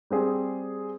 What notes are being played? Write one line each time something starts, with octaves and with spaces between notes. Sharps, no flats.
G3 C4 G#4